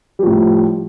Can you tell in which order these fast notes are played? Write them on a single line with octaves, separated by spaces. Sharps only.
G3 F3 A2